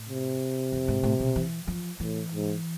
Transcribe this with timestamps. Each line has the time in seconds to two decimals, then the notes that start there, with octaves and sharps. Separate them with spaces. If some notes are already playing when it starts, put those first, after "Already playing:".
Already playing: A2
0.09 C3
0.72 F2
0.88 G#2
1.03 A2
1.20 B2
1.36 E3
1.67 F3
2.00 A2 E3
2.32 G#2